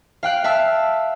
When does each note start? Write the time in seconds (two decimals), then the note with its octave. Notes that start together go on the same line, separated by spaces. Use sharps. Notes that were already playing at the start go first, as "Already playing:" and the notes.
0.23 F5 G5 F#6 D7
0.44 E5 F5 A5 E6